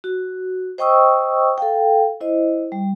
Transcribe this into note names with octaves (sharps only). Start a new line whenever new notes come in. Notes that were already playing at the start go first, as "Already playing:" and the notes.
F#4
C5 D#5 G5 C#6 D#6 E6
A4 F5 G5
E4 C5 D#5
G3